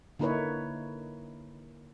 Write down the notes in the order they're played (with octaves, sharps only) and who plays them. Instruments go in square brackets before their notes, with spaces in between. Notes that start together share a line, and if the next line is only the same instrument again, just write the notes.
[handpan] D3 A#3 D#4 E4 B4 C#5